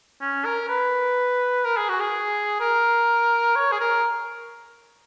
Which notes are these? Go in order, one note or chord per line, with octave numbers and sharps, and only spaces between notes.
C#4
A#4
B4
A#4
G#4
F#4
G#4
A#4
C#5
G#4
A#4